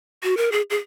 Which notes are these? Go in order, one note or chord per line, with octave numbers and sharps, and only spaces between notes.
F#4
A#4
G#4
G#4